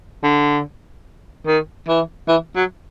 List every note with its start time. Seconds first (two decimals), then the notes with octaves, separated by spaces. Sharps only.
0.23 D3
1.46 D#3
1.88 E3
2.28 E3
2.56 F#3